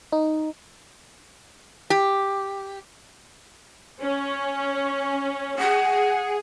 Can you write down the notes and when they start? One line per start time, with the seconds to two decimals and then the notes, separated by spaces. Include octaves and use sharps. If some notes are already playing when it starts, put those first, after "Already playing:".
0.12 D#4
1.90 G4
4.01 C#4
5.58 G#4 F#5